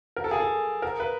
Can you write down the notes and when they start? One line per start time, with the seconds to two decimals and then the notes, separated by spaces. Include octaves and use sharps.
0.16 A#4
0.24 A4
0.31 G#4
0.40 A4
0.82 A#4
1.00 B4